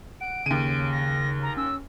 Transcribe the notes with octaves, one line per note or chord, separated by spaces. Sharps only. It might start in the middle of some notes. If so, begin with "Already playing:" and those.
F#5 D7
D#2 C#3 D#7
A#6
A#5
C#4 E6